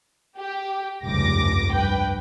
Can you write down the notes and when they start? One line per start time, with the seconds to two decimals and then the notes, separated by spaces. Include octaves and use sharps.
0.39 G4
1.05 F1 C#2 G2 D6 A#6
1.73 G2 B4 G5